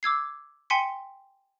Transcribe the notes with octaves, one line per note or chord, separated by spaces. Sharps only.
D6 E6 G#6 C7
G5 G#5 C6 B6 C#7